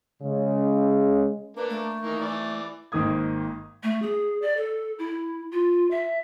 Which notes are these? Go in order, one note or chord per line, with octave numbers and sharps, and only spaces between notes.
C#3 G#3
A#3 D4 B4
A3
D#3 E3 A#3
E3 D5
G#1 D#3 A#3 D#6 G#6
A3
G#4
D5
A4
E4
F4
E5